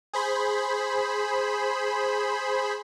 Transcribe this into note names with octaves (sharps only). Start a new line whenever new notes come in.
G#4 C5 B5